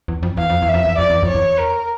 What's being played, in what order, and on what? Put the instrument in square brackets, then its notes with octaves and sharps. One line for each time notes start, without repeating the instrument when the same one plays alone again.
[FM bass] E2
F2
[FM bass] E2 [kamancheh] F5
[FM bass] F2
E2
[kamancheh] E5
[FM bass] F2
E2
[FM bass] F2 [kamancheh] D5
[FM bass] E2
F2
[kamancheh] C#5
[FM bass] E2
[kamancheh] A#4